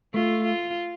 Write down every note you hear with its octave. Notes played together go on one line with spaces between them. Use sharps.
A3 F4
F4